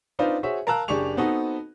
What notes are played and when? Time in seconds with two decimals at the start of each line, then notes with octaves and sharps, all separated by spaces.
0.19 C4 D4 D#4 F4 B4 C5
0.43 F#4 G#4 C5 C#5 E5
0.67 A#4 F5 A5 A#5 E6 F#6
0.88 F#1 D4 G4 G#4 C#6 F7
1.17 B3 C4 D#4 F#4 A4